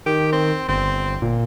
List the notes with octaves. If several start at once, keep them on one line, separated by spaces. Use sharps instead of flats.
D#3 G4
C4
G1 C4
A#2